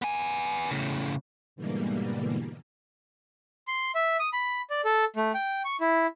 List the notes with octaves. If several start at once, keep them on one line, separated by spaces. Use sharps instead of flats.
B3 G#5
A2 C#3
G#2 B2 D3 E3 G3 A#3
C6
E5
D#6
B5
D5
A4
A3
G5
C#6
E4